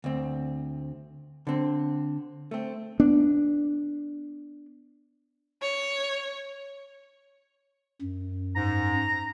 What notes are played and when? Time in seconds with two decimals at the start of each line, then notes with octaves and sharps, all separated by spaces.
0.04 D2 C4
1.47 D3 C4
2.51 A3 C4
3.00 B3 D4
5.62 C#5
8.02 F#2
8.56 G#2 A#5